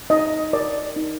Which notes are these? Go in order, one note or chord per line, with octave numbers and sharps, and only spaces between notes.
D#4 D#5
A#4 D5
D#4